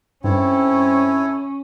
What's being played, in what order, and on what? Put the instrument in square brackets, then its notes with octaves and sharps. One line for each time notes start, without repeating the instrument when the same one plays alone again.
[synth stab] G2 [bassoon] C4 [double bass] C#4 [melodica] E4 A4 C#5